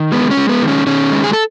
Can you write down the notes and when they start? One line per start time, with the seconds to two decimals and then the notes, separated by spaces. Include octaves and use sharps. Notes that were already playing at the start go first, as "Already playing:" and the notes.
Already playing: D#3
0.12 G#3 B3
0.31 C#4
0.37 G#3
0.49 B3
0.62 D#3
0.68 C#4
0.87 D#3 C#4
1.11 G#3
1.24 G#4
1.33 A4